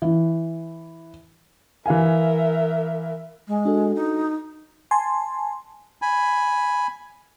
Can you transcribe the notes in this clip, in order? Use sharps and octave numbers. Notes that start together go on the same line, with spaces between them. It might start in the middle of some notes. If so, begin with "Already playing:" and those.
E3
E3 A#4 E5 F5 G#5
G#3
D4 F#4 A4
D#4
G#5 A5 C6
G#5 B5